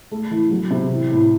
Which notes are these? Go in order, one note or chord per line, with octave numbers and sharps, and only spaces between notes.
A3
E3
F#3
C3
E3
A2